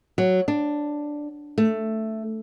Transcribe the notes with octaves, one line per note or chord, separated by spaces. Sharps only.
F#3
D4
A3